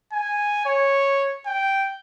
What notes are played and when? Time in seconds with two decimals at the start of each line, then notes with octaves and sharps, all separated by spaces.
0.13 G#5
0.66 C#5
1.46 G5